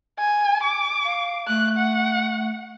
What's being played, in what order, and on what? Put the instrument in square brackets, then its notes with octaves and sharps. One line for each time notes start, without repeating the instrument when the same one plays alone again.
[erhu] G#5
D6
[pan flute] F5
[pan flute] A3 [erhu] F#6
[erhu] F#5